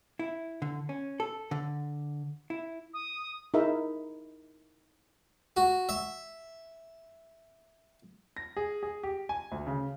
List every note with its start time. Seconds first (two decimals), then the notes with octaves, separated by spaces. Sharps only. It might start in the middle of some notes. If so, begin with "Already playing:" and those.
0.19 E4
0.62 D3
0.89 C#4
1.20 A4
1.51 D3
2.50 E4
2.94 D#6
3.54 D#4 E4 G#4 A#4 E5
5.57 F#4
5.89 E5
8.37 A#6
8.57 G#4
8.83 G#4
9.03 G4
9.29 G#5
9.52 D2
9.67 C#3